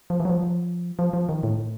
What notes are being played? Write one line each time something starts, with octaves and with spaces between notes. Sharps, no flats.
F3
E3
F#3
F3
F3
F3
D#3
A2